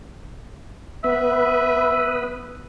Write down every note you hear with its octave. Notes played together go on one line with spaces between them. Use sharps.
B3 B4 E5